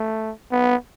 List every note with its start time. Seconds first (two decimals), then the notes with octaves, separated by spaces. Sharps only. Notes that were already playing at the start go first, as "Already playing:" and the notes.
Already playing: A3
0.52 B3